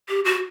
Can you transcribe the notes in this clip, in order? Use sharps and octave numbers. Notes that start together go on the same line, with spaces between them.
G4
F#4